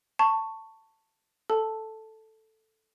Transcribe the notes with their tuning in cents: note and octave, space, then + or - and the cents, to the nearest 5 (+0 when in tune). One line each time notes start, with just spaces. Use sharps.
A5 +15 C#6 +0
A4 +0 A5 +0